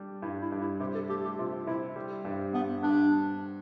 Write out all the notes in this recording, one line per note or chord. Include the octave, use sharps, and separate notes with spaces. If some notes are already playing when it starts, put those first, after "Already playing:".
Already playing: G3 D4
G2 E4
E4
G2
E4
C3 G4
A4
A3 G4
G4
C3 F4
C3 E4
G3
G2
G2 B3
G2 D4